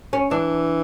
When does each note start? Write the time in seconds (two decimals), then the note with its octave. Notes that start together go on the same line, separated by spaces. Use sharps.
0.13 C#4
0.31 E3 D4